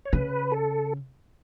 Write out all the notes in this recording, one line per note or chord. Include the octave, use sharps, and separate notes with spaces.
C#5
C#3 B4
A4